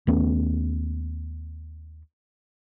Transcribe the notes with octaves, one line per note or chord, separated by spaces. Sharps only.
D#2 A3 B3 C#4